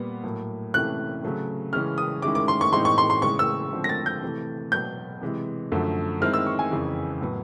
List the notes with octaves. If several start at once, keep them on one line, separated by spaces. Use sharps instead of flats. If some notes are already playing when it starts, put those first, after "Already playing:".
Already playing: A#2 G3 B3
A2 F#3 A#3
C3 E3 A3 C#4 E4 F#6
C#3 F#3 A3 C4
C#3 E3 G#3 C#4 F6
D#6
D#3 G#3 C#4 E4 D6
D6
C6
C#6
A2 E3 G#3 C4 D#4 C6
C#6
C6
C6
C#3 E3 G#3 C#6
E6
D3 F3 G#3 C4
A#6
A6
G6
C3 E3 A3
B2 F#3 B3 G6
C3 E3 G#3
F#2 D3 F3 A3
D#3 G#3 C4 E4 F6
E6
C#6
G#5
F2 C#3 E3
A2 F#3 B3